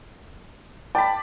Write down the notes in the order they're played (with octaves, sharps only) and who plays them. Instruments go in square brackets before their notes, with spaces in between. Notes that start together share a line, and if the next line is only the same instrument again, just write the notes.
[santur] D5 A5 B5 [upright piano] G5